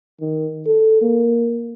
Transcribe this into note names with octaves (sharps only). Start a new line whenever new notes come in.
D#3
A4
A#3